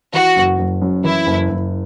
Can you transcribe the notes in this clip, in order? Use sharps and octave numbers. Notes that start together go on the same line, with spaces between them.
E3 F#4
F#1
F#1
F#2
E3 E4
F#1
F#1